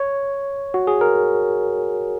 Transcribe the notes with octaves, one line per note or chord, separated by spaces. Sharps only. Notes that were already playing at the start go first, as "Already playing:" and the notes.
Already playing: C#5
F#4
G#4
A#4